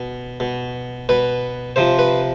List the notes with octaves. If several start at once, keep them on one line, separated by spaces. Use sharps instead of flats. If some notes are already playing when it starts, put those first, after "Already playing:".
Already playing: B2
B2
B2 B4
C3 F3 C5
B4